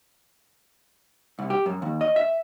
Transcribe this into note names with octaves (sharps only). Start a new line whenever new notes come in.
C2
G4
F#2
D#2
D#5
E5